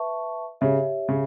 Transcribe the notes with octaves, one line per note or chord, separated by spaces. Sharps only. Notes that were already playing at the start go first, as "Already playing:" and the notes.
Already playing: B4 E5 A5 C#6
C#3 G4 C#5 E5
C#3